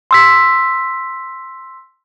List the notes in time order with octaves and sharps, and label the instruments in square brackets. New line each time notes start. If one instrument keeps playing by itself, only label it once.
[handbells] C6 E6 B6